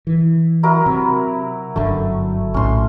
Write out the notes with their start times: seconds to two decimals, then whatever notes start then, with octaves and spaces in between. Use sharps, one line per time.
0.07 E3
0.63 F#3 E4 A#4
0.86 C3
1.76 G1 F#2 D3 A3
2.54 A#1 A2 C#4 C6